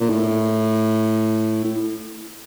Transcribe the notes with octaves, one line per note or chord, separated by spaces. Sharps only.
A#2
A2
A2